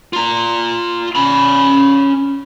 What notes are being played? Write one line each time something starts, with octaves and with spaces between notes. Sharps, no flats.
F4 A#5
C#4 B5